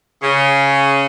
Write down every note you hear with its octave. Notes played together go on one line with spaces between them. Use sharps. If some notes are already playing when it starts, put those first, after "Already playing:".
C#3